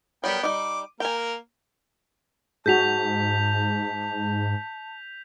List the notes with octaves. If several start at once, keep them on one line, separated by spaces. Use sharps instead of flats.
F#3 G3 B3 A#4 G5
G3 D#4 D6
A#3 A#4 G5 G#5
G#2 F#4 G#4 A5 G6 B6 F7